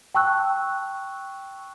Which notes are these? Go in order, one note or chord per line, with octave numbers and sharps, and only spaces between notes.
G5 A5 C#6 E6 F#6